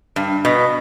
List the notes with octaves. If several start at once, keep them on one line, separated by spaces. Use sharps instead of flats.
G2
B2